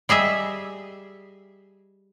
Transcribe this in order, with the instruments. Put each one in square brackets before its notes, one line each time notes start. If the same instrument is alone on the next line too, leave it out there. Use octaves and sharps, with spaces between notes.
[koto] G3 G#4 D#5 E5